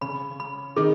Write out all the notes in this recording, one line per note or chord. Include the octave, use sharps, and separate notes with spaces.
C#3 C#4 B5
B5
D#3 D#4 G#4